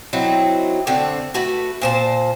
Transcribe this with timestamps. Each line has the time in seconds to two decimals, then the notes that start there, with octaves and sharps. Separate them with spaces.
0.13 F#3 C4 D#4 E4
0.87 D3 A3 C4
1.34 A3 F#4 B4
1.81 A#2 C5 A5